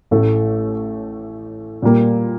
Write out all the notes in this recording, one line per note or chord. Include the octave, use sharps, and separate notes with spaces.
A1 A2 A3
A#2 G3 A#3